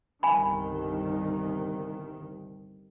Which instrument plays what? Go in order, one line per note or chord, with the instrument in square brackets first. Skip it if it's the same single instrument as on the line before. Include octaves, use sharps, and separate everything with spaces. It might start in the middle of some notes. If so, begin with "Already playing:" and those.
[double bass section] G1 C2 D#3 [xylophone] G#5 B5